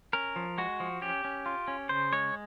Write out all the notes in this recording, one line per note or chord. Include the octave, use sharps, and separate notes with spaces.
C#4 A#4
F3
G#3 F#4
F3
C#4 G4
C#4
F4
C#4
C#3 C5
G#3 C#5